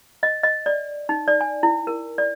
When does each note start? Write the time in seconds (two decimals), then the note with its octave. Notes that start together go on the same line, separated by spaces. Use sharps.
0.23 D#5
0.43 D#5
0.66 D5
1.09 D#4
1.28 D5
1.41 G#5
1.63 E4
1.87 A#4
2.18 D5